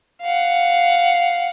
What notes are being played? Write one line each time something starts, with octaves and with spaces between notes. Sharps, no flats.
F5 F#5